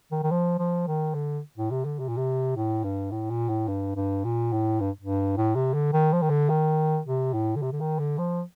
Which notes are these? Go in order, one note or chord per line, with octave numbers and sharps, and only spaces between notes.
D#3
D#3
F3
F3
D#3
D3
A2
C3
D3
C3
A#2
C3
A2
G2
A2
A#2
A2
G2
G2
A#2
A2
G2
G2
A2
C3
D3
D#3
F3
D#3
D3
D#3
C3
A2
D3
C3
D3
D#3
D3
F3